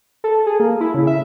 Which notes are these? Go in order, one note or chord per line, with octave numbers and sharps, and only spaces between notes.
A4
G#4
A#3
E4
C#3
E5